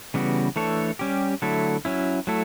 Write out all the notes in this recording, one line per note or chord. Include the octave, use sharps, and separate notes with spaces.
C#3 E3 G3 B3 F#4
E3 A3 D4 A4 C#5
G3 C#4 G4
D3 F#3 A3 E4 A4
F#3 C#4 E4
F#3 A3 E4 A4